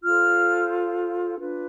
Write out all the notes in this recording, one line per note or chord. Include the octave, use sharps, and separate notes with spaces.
F4 A4 C5 F6
D4 F4 B4